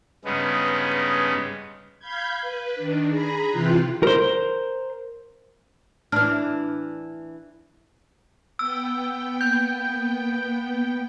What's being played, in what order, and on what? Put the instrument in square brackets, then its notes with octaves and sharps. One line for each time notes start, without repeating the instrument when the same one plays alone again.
[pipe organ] G2 C#3 G#3 B3 D#4
[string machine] F5 B5 G6 G#6
B4
D#3 D4
G#4 A#5 B5
C3 E3 F4 G5 C6 F#6
[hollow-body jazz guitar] A#4 C5
[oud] E3 D4 [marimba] F6
[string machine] B3 G5 [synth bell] E6
[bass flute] A#3 [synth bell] G6